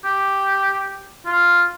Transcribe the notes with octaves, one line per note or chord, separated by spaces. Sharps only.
G4
F4